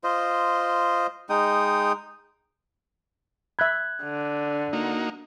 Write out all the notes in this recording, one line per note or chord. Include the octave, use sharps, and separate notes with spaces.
F4 C5 D#5
G#3 D#4 G5 D#6
E5 B5 F#6 G#6
D3
A#3 D#4 F#4